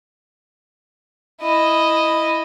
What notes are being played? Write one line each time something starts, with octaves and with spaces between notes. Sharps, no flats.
E4 D#5